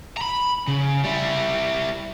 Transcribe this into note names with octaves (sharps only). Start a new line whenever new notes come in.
A#5 B5
C#3
G3 E4